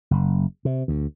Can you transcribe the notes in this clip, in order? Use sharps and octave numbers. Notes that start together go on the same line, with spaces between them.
F#1
C3
D2